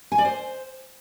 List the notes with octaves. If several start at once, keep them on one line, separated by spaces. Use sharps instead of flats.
G#5
D5
C5